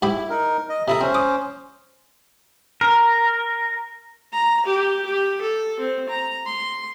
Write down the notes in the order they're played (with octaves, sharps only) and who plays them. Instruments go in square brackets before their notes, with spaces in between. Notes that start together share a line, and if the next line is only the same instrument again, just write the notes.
[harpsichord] G#2 G4 B5 [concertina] E4
[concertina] D#4 A#4
D#5
[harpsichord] C3 E4 A4 [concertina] E5 A#5 D#6
[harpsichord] C4 [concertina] C#4 C5
[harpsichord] D6 D#6
[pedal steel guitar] A#4
[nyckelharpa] A#5
G4
G4
A4
C4
A#5
C6